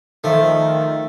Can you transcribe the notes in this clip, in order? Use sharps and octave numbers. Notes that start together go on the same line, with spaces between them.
D#3 F3 A3